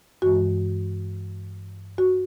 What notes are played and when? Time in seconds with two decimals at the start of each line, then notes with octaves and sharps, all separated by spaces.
0.22 G2 E3 G#3 F#4
1.98 F#4